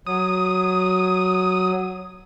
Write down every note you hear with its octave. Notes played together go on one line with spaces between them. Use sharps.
F#3 D#6